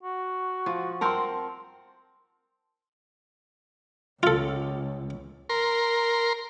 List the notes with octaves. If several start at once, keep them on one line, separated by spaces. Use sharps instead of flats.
F#4
F3
C4 A#4 F#5 A5 C6
C#2 F4 A4
A#4 C6